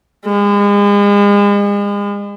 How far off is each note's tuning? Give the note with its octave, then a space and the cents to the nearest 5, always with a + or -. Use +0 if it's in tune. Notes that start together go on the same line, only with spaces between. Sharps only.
G#3 -40